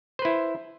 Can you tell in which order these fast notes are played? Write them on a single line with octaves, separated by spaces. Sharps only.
C5 B4 E4